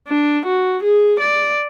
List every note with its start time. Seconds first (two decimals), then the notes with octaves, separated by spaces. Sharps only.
0.08 D4
0.46 F#4
0.83 G#4
1.20 D5